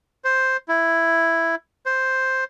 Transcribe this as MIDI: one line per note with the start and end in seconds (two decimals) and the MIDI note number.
0.24 0.57 72
0.68 1.55 64
1.86 2.44 72